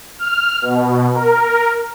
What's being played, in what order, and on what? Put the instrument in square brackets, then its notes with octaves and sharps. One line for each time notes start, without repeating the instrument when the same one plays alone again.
[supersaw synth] F6
B2
A#4